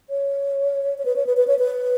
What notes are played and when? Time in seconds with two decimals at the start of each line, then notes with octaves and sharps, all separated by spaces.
0.10 C#5
0.98 C#5
1.05 B4
1.16 C#5
1.27 B4
1.37 B4
1.47 C#5
1.59 B4